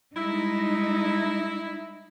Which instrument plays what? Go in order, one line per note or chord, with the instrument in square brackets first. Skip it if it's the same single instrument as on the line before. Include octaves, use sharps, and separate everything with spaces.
[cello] G3 G#3 [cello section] D#4 [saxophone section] E4